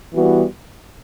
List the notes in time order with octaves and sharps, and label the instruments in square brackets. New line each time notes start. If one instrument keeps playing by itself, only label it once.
[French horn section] E3 G3 B3 F#4